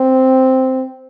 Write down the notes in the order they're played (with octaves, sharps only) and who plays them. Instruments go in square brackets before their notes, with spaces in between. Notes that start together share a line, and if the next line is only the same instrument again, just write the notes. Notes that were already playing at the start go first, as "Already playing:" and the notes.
Already playing: [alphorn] C4